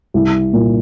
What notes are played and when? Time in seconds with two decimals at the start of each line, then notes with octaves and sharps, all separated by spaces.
0.14 C2
0.53 A#2